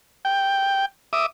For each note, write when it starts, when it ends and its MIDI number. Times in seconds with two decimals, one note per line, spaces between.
0.25 0.85 79
1.13 1.26 76
1.13 1.26 86
1.13 1.26 87